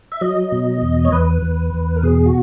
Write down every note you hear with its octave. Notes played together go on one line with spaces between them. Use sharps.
E5
F#3 D#5
B2
E2
C#5
E2 B4
E2
E2
A#4
B2 G#4
F#4